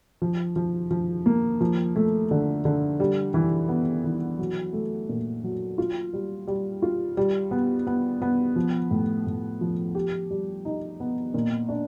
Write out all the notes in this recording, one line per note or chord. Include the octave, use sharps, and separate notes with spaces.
F3
F3
F3
A#3
F3
A3
D3
D3
G3
E3
B3
E3
F#3
A3
A#2
F#3
F4
G3
G3
F4
G3
B3
B3
B3
F3
A2
A2
F3
G4
G3
D#4
B3
A#2
D4